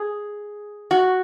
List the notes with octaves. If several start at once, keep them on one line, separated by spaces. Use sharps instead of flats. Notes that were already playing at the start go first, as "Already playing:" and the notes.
Already playing: G#4
F#4